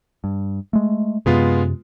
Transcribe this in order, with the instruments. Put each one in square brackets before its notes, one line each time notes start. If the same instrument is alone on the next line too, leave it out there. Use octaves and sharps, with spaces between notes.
[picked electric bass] G2
G#3 A3
[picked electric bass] F#2 C3 [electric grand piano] G#3 B3 F4